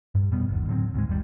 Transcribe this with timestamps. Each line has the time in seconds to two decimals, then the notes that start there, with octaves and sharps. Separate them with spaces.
0.15 G2
0.31 F2 B2 G3 B3
0.48 G1 D#2
0.67 A2 D3 F#3 C4
0.94 D2 G#2 G#3
1.08 G1 D#2 G3